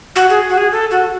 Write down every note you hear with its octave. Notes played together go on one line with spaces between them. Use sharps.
F#4
G#4
F#4
G#4
A4
F#4